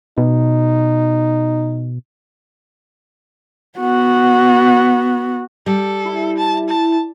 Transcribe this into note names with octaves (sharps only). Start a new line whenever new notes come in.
B2 D#4
B3 F#4
G3 A4
E4
A5
A5